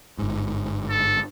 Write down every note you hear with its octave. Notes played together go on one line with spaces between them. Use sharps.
G1 G#2
A4